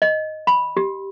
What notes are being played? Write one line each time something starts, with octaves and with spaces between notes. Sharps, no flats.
D#5
B5
G4